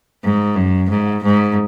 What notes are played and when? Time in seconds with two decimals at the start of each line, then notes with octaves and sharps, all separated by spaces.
0.23 G#2
0.56 F#2
0.90 G#2
1.23 G#2